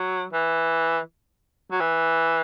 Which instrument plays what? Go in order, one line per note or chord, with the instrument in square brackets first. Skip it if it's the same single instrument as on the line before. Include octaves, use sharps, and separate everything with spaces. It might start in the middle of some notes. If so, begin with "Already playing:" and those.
Already playing: [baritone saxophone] F#3
E3
F#3
E3